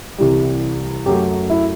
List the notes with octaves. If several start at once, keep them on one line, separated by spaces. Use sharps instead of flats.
C2 C3 E3 G3
F#2 F#3 A3 G4
E4